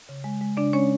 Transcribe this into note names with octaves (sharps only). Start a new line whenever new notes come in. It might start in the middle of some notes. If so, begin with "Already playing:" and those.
C#3
G#3
G#3
C#3 D4 D5
G#3 C#4 C#5